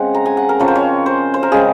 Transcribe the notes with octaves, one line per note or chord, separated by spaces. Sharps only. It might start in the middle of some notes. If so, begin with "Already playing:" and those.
Already playing: C#3 G#3 C4 F#5
A#5
G#5
F#5
A#4
C#3 F3 C4 C#5
C5
C#5
C5
C5
A#4
C#3 G#3 C4 G#4